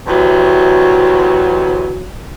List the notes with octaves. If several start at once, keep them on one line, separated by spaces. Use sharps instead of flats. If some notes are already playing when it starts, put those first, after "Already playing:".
D2 C3 E3 F#3